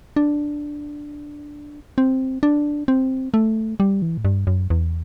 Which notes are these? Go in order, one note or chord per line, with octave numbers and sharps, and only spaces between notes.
D4
C4
D4
C4
A3
G3
E3
A2
G2
F#2
E2